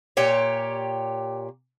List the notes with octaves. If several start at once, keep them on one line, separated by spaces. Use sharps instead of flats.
A#2 G4 C#5